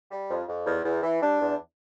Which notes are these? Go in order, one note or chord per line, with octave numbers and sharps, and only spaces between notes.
G3
F2
F2
E2
E2
E3
G3 D4
E2